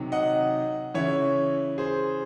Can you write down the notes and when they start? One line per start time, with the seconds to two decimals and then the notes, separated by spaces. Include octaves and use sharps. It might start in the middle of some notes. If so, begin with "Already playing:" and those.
Already playing: C3 D#3 F#3
0.12 D#5 F#5
0.94 C#3 E3 C#5 E5
1.78 G#4 C5